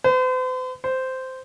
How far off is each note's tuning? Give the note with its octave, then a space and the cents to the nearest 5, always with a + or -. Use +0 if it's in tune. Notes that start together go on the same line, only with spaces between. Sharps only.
C5 -45
C5 -10